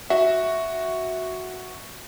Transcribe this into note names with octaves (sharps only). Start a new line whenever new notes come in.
F#4 E5